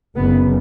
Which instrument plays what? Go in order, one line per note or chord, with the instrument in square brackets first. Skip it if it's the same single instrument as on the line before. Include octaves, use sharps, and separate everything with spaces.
[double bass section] F#1 F#2 C#3 B3